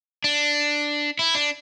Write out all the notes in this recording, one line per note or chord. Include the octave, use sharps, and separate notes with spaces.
D4
E4
D4